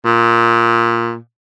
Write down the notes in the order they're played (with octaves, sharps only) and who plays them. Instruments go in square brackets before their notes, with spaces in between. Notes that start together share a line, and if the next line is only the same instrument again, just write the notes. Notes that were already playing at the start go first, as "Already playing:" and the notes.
[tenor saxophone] A#2